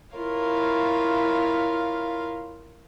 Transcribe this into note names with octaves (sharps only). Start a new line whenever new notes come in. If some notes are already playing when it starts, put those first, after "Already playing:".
E4 F4 A#4 C#5 F5